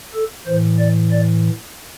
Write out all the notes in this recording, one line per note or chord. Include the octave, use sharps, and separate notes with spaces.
A4
A2 E3 C5
D5
D5